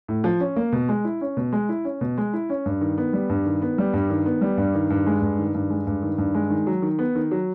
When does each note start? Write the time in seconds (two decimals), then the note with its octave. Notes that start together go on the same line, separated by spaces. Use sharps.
0.08 A2
0.24 F3
0.40 C#4
0.56 A#3
0.72 B2
0.89 G#3
1.05 E4
1.21 C#4
1.37 B2
1.53 G#3
1.69 E4
1.85 C#4
2.01 B2
2.18 G#3
2.33 E4
2.50 C#4
2.66 G2
2.81 D#3
2.98 B3
3.13 G3
3.29 G2
3.46 D#3
3.62 B3
3.78 G3
3.93 G2
4.10 D#3
4.26 B3
4.41 G3
4.58 G2
4.75 D#3
4.90 G2
5.06 G#3
5.22 G2
5.38 D#3
5.54 G2
5.70 G#3
5.87 G2
6.03 D#3
6.18 G2
6.34 G#3
6.50 D#3
6.67 F#3
6.82 D#3
6.99 B3
7.15 D#3
7.31 F#3